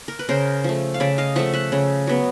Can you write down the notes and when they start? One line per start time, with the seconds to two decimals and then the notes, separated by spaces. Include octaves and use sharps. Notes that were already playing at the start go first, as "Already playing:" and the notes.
0.08 A#4
0.19 B4
0.29 C#3 A#4 C5
0.64 F3 A3
0.94 F5
1.00 C#3 D5 E5
1.18 D#5 F5
1.36 F3 A3 E5 F#5
1.54 E5 F#5
1.72 C#3
2.07 F#3 B3